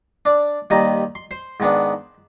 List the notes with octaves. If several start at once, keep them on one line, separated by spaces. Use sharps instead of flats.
D4 D5
D#2 D#3 G3 D#4 D#5
C6
C5 C6
G#2 D#3 B3 D4